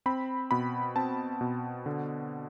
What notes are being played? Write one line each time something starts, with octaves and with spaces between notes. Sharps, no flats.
C4 B5
B2 B5
C4 A5
B2
D3